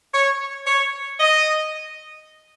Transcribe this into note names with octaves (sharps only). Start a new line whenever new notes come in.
C#5
C#5
D#5